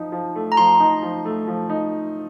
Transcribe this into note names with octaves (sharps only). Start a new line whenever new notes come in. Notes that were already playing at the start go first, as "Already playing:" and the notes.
Already playing: F3 D#4
F3
A3
A#5
F3 C6
D#4
F3
A3
F3
D#4